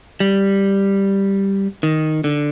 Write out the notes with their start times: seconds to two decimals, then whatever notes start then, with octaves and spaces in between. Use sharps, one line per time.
0.20 G3
1.83 D#3
2.24 D3